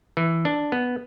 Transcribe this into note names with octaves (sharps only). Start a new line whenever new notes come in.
E3
D4
B3